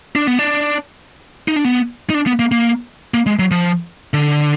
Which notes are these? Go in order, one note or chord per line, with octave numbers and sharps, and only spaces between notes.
D4
B3
D4
D#4
D4
B3
D#4
D4
B3
A#3
A#3
A#3
G#3
F#3
F3
D3